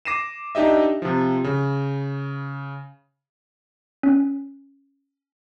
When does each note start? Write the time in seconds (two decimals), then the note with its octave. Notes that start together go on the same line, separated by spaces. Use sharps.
0.05 D6 A#6 C7 D#7 E7
0.55 D4 D#4 G4 D#5 E5
1.02 C3 F3
1.44 C#3
4.03 C#4